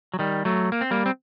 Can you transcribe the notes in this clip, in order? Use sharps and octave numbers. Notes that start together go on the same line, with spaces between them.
F#3
D#3 G3
F#3 A3
A#3
C4
G3 A#3
C4